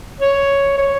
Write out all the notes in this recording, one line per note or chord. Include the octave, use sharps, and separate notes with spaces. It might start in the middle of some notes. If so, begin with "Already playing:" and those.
C#5
C#5